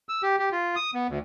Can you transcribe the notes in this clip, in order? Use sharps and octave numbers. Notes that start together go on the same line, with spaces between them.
E6
G4
G4
F4
D#6
B3
D2